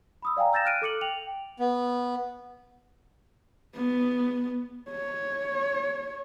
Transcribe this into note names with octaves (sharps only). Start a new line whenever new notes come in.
B5 D#6 E6
D5 F5 G5 G#5 A#5
E6 G6 A6 A#6 E7
F6 F#6 D7 D#7
A4 D6 C#7 F#7
G5 F7 F#7
B3
B3
C#5